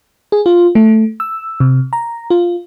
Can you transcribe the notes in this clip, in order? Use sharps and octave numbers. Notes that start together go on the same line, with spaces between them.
G#4
F4
A3
E6
C3
A#5
F4